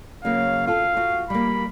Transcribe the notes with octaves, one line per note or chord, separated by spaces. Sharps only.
C#3 F#3 A#3 F5
F4 A4 F5
F4 F#4
G3 A#3 B5